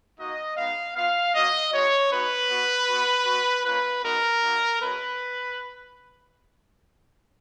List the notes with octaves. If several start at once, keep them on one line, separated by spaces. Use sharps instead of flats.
A#3 D#4 F#4 D#5
G#3 B3 D#4 F5
B3 F4 F5
A#3 C#4 F#4 D#5
G#3 D#4 F#4 C#5
B3 D#4 F#4 B4
B3 F#4
B3 F#4
B3 F#4
A#3 C#4 F4 B4
G#3 B3 D#4 F#4 A#4
A#3 D#4 F#4
G#3 C#4 F#4 B4